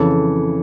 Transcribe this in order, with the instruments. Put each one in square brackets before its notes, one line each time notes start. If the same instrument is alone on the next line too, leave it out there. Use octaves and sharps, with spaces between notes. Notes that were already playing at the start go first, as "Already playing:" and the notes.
Already playing: [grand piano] F2 C#3 E3 A4